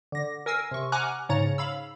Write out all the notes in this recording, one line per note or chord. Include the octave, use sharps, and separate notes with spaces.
D3 A#6
A#4 G#5 E6 C7
C3 C#6
F#5 G#5 A#5 D6 F6 F#6
G#2 C#3 C#5 A#5 A6
F5 B5 E6